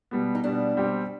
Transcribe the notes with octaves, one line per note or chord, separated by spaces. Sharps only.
B2 G3 B3
D#4
B2 G3 B3 D4
B2 G3 C4 G4